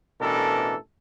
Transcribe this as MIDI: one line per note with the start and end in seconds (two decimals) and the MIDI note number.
0.21 0.76 33
0.21 0.76 47
0.21 0.76 52
0.21 0.76 62
0.21 0.76 69
0.21 0.76 70